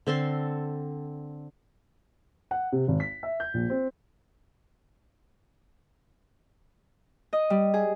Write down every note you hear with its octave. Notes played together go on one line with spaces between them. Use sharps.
D3 C4 A4 C6
F#5
C3
G#1
B6
E5
G6
A#1
C4
D#5
G3
G#4